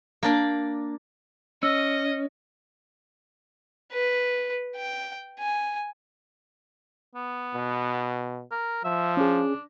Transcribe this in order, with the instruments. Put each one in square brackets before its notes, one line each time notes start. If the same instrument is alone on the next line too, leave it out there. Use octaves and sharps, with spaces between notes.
[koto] A#3 D4 D5
[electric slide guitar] C#4 [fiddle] D#5 [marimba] E6
[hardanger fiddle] B4
G5
G#5
[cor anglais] B3
[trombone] B2
[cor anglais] A#4
[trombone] F3 [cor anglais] E5
[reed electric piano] C#4 G#4 [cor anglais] D4